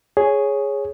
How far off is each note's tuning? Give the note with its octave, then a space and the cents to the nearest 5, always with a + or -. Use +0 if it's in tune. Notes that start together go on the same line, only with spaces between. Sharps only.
G#4 +0 C#5 +0